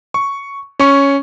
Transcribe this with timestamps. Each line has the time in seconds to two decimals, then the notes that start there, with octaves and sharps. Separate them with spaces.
0.14 C#6
0.80 C#4 C#6